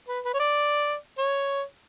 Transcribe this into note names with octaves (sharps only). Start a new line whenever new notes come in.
B4
B4
C#5
D5
C#5